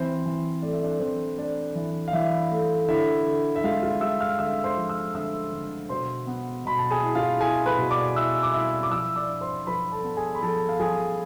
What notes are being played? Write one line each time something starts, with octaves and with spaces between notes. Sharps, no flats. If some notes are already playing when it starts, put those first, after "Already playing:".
Already playing: E3 C4 C5
E3
A3 D5
E5
D4 D5
E3 C4 C5
A3 D4 D5
E3
F5
E3 E4 E5
A3
D3 E4 E5
D3
E5
G#3 F4 F5
F4 F5
G#3 E5 E6
F5 F6
D3 E5 E6
C5 C6
F3
E5 E6
D3 E5 E6
D3
B2 C5 C6
B3
B2 B5
A5
G#4 G#5
E4
F4 F5
E4 G#4 G#5
B4 B5
B2
D5 D6
E4 E5 E6
D6
E4 E5 E6
D6
F3 E5 E6
D5 D6
D4
C5 C6
F3 B4 B5
A4 A5
B3
G#4 G#5
B5
F3 A4 A5
F5
F3 G#4 G#5